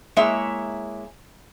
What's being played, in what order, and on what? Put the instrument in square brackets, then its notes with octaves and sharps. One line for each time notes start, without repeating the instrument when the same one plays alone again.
[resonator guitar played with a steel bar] G#3 A#3 E4 C#5 E5